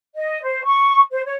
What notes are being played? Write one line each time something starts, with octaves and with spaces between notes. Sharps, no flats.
D#5
C5
C#6
C5
C#5